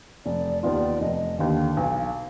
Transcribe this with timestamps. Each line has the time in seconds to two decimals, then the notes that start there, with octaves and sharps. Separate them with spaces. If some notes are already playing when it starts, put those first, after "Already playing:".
0.25 F1 D5
0.63 D#2 D#3 B3 F4 D5
1.01 F1 D#5
1.39 D#2 D3 F5
1.76 B1 F5